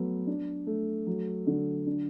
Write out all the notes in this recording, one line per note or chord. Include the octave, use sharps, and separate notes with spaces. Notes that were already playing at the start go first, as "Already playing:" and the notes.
Already playing: F#3 A3 B3
D4
A3
F#3
D3
D4